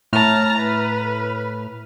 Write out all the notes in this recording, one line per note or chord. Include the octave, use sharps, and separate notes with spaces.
A2 A5 A#5 F6
B4